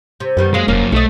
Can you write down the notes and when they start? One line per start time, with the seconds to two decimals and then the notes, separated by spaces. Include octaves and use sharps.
0.20 C3
0.37 F#2 D#3 G3 B3
0.54 F#3 G#3 A#3
0.68 E1 F#2 A#3 C#4
0.92 B1 A3 C#5 D#5